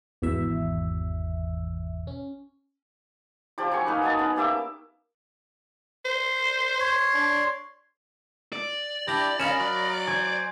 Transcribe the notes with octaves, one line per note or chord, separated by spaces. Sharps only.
G#1 E2 B2 E5
C#4
F3 G4 D5 D6
F#3 G#5 C#6
A#3 C#4 D#4 B4
F#4 D#5 G#5 A5
B3 C#4
A#3 G4 E5 D6
C5
C#5 C6
D4
D5
D4 E4 G4 A#6
C#4 A#4 D#5 F5 B5 E7
F#3
C5 G#5 G#6